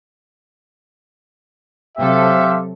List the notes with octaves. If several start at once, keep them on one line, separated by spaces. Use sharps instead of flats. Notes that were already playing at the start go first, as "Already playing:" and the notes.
C3 F#3 G4 A4 C5 E5 F5